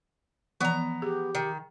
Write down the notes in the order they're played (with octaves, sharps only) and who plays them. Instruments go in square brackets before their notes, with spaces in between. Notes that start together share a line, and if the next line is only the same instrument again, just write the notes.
[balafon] E3 F3 [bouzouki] B3 A#5
[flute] G4 [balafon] G#4
[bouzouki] D#3